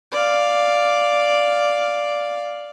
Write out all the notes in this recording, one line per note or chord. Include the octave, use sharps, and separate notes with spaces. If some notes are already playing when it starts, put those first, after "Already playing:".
D5 F5